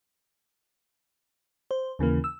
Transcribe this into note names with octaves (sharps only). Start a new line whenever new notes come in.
C5
D#2 C#3 E3 A#3
E6